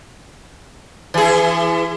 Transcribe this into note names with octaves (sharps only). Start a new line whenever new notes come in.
E3 G#4